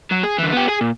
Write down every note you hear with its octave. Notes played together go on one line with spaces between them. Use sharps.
F#3
G#4
D3 E3
B3 G4
G#4 G#5
A#2